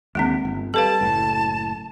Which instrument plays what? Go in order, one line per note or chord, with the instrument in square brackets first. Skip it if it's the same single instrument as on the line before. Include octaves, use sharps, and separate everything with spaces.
[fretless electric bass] D#2 D3 [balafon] G#3 A#3 C4
[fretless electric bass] G1
[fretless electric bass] G3 [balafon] A4 B4 F5 [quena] A5
[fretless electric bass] F#1 A2